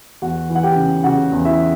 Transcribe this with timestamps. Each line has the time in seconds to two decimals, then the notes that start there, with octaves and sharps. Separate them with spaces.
0.22 E2 F#4 F#5
0.50 E3
0.55 F#5
0.63 G4 G5
0.76 C#3
1.04 C#3 F#4 F#5
1.32 E2
1.45 E4 E5